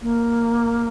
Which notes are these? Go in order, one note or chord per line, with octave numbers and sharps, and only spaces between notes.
A#3